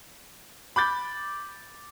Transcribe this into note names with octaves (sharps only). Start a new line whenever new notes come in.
B5 D6 G6 A6